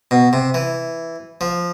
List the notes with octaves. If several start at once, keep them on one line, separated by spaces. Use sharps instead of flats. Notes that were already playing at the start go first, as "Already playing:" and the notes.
B2
C3
E3
F3